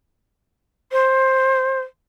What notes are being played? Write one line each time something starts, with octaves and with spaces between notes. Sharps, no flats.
C5